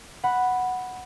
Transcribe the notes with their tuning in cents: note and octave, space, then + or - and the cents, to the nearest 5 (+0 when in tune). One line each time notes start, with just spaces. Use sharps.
F#5 +0 B5 +0